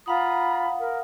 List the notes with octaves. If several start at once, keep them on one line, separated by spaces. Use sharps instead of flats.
F4 F5 F#5 A#5 B5 D#6
A#4